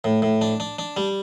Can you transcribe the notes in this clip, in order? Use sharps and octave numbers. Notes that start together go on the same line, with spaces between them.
A2
A2
D4
D4
D4
G3